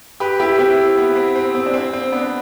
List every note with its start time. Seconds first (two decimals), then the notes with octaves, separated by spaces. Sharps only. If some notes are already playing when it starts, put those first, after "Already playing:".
0.20 G4 B4
0.40 E4 G4
0.59 C4 E4
0.97 B3
1.16 C4
1.36 C4
1.55 C4
1.66 D4
1.74 C4
1.93 C4
2.12 B3 D4